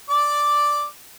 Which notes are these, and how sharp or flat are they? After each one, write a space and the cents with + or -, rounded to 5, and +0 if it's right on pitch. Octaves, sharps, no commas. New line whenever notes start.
D5 +0 D6 +0